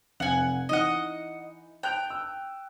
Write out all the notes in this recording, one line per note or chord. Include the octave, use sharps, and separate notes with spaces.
F1 F5 F#5 G#5 C#7
E3 D#4 D#5 F#5
G5 A5 F#6 F7
E6